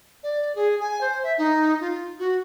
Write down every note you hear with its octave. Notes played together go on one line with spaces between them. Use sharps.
D5
G#4
G#5
C5
E5
D#4
F4
F#4